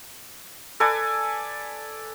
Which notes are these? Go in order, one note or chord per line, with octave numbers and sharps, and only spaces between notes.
A4 B4 D5 G#5